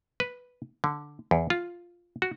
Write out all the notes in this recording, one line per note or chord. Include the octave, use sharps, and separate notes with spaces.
B4
D3
E2
F4
F#4